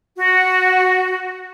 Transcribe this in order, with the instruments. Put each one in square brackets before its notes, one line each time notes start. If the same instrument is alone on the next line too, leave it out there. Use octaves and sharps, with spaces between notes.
[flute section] F#4